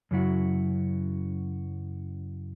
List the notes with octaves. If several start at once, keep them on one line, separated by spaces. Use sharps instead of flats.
F#2 C#3 F#3 E4 F#4